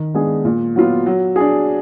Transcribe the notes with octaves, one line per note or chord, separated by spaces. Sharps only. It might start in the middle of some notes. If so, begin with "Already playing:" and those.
Already playing: D#3
G#3 B3 D4 G#4
A#2
F#3 B3 F4
F#3
D4 G#4